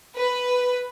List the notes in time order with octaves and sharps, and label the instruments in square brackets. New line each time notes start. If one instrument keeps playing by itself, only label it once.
[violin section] B4